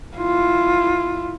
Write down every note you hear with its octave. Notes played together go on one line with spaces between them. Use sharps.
E4 F4